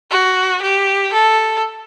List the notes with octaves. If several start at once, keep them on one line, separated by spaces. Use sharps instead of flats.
F#4
G4
A4